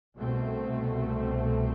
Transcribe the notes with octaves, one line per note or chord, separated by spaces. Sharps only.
C2 B2 A3 C4